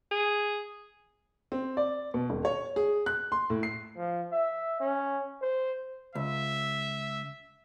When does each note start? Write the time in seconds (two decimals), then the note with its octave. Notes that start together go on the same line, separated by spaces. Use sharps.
0.11 G#4
1.52 C4
1.77 D5
2.14 B2
2.30 D#1
2.45 C#5
2.76 G#4
3.06 F#6
3.32 C6
3.50 A2
3.63 C7
3.97 F3
4.32 E5
4.80 C#4
5.41 C5
6.15 C#2 E5